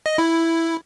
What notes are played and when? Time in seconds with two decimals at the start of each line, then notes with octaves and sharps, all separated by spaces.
0.06 D#5
0.18 E4